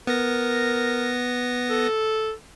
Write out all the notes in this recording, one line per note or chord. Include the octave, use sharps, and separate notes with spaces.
B3 A#4 A#6
A4